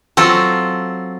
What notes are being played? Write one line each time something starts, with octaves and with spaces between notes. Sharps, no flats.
F#3 C4 F4 A4